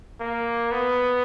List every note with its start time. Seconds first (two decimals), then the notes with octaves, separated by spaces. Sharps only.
0.20 A#3
0.72 B3